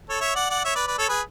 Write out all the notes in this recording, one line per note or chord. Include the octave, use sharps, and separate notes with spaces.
A4 C#5
C#5 E5
D5 F#5
D5 F#5
C#5 E5
B4 D5
B4 D5
A4 C#5
G#4 B4